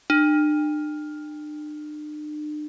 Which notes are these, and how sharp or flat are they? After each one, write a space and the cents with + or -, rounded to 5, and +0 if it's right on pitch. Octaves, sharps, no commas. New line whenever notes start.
D4 +45